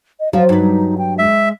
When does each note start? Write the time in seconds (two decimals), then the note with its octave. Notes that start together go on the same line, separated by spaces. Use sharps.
0.20 D#5
0.33 F3 F#3 F5
0.49 G2 D#4 B4
0.98 G5
1.19 G#3 E5